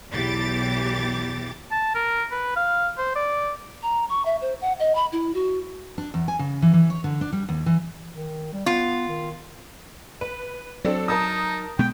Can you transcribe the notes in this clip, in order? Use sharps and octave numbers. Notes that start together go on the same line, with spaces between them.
B1 E2 E3 G4 D6 A6
A5
A#4
B4
F5
C5
D5
A#5
C#6
E5
C5
F#5
D#5
B5
E4
F#4
D4
E2
G#5
C#3
E3
E3
C#5
D3
D4
G3
D#2
E3
D#3
G3
B3 F4
D#3
B4
F#3 C4 D4 A4
D#4 A#4 A5 D#6
B2 G#3 B3 G5